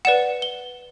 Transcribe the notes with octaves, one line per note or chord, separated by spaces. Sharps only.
B4 D5 F#5 E7
G7